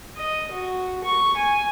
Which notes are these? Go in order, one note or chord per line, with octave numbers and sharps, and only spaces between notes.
D#5
F#4
C#6
G#5